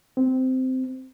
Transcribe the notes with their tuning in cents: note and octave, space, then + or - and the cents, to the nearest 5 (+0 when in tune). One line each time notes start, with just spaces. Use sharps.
C4 -15